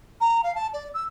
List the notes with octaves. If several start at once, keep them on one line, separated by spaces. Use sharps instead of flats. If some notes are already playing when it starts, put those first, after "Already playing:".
A#5
F5
A5
D5
E6